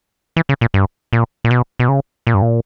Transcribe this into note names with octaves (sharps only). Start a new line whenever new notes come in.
E3
C#3
A#2
G2
A#2
A#2
B2
B2
C#3
A#2
G2
A#2